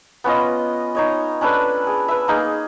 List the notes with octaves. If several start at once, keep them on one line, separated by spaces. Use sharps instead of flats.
B3 C#4 F4 D#5
D#4 C#5 D#5
C#4 D4 A4 B4
G#4
B4 E5
A#3 D#4 G#4